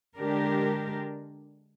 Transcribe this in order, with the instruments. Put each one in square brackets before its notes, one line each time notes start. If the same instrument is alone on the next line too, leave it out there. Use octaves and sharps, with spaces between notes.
[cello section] D3 G#3 D4 G4 A#4